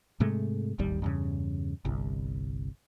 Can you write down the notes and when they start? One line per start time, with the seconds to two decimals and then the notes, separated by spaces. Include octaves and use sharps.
0.20 G#2 C3 G#3 A3
0.79 D1 G#1 D#2 G3
1.02 E2 G2 C#3
1.85 G1 C2